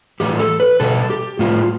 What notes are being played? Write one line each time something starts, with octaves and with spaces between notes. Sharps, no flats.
A2 E3 G3 G4
A4
B4
B2 G3 A4
G4
A2 G3 F4